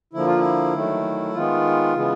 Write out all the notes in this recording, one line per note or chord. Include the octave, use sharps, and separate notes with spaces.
D3 F3 A#3 E4
F4
E4
D#3 F#3 A3
D#3 G#3 B3 F4
C#3 E3 G#3 B3